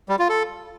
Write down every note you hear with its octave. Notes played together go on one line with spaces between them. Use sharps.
G3
F4
A4